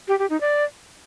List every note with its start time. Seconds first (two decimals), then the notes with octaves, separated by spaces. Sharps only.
0.08 G4
0.19 G4
0.30 D#4
0.41 D5